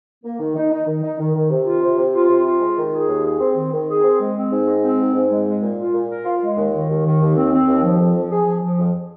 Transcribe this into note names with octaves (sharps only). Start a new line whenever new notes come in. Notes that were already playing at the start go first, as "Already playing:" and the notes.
A#3
D#3
D#4
D#4
D#3
D#4
D#3
D#3
C3
F4
C3
C3
F4
C3
F4
G#3
D#3
G#4
D#2
G#4
C4
D#3
D#3
G#4
C4
G#3
C4
G#2
G#3
C4
G#2
G#2
G#3
G#3
A#2
F4
A#2
A#4
F4
G#3
D#2
D#3
D#2
D#3
D#2
C4
C4
D#2
F3
F2
F3
G#4
F3
F3
F2